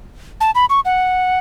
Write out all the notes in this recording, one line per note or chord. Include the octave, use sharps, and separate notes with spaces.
A5
B5
C#6
F#5